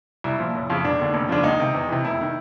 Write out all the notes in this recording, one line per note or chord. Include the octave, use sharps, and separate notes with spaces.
C2 E4
A#2 F3
F#1
F2 C#3 F3
E1 D4
D#2 D3
F1
D#2 C#3 F3 D4
C#2 D#4
C3 D#3
E2
C3 E3
F1 E4
D#3